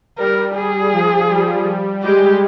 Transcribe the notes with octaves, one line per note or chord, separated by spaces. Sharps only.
G3 A#4
G#4
F3
G3
G#3 G4